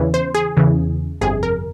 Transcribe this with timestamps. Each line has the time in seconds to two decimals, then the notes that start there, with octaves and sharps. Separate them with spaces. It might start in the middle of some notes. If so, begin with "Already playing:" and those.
Already playing: E2 C#3 E3
0.14 C5
0.35 G#4
0.57 E2 C#3 E3
1.21 G1 F2 C3 G#4
1.43 A#4